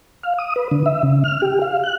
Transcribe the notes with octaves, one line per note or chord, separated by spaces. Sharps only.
F5
D#6
B4
D3
E5
C#3
F6
G4
F5
F#6